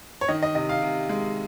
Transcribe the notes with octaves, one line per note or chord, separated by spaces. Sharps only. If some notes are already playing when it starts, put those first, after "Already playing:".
C#5
D#3 D#5
D#5
C3 D#5
F5
C3
G#3